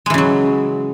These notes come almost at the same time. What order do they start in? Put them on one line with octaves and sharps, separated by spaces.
G#3 E3 C#3 F#3